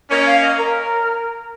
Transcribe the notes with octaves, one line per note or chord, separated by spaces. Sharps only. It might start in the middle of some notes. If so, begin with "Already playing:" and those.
A#3 C#4 D#5
F5
D#5
A#4